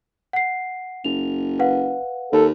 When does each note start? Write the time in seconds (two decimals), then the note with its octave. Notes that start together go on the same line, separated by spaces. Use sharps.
0.33 F#5 C7
1.04 F#1 F7
1.59 B4 F5 F#5
2.32 D#2 A4